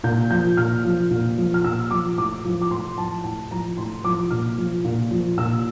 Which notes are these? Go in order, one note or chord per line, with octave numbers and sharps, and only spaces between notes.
A#2 G6
F3 G6
A#2 F6
F3
A#2
F3
F6
A#2 E6
F3 D6
A2 D6
F3
D6
A2 C6
F3 A5
A2 A5
F3 A#5
A2 C6
F3 D6
A#2 F6
F3
A#2
F3
A#2 E6